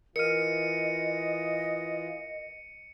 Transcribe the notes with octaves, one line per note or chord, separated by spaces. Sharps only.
E3 F4 A#4 D#5 F6 C#7 D#7